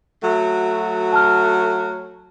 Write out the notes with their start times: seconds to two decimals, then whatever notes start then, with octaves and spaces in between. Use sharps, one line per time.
0.23 F#3 A3 F#4
1.12 A5 F6